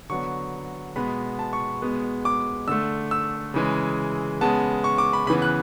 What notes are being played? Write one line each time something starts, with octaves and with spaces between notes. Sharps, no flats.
D3 F#3 B3 C#6
B2 G#3 B3 B5
A5
C#6
B2 G#3 B3
D6
D3 A3 E6
E6
C#3 E3 G#3
C#3 G#3 B3 A5
C#6
D6
B5
C#3 E3 B3 B5
F#6